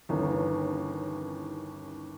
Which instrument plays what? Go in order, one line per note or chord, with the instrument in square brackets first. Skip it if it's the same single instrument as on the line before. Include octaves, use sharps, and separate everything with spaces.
[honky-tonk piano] G1 D#2 E3 C#4